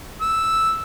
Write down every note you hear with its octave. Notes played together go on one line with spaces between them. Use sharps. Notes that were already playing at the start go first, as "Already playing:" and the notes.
E6